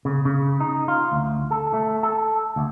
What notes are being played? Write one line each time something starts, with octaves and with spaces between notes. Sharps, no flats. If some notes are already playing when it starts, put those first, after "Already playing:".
C#3
C#3
D#4
F4
D2
A4
A3
A4
D2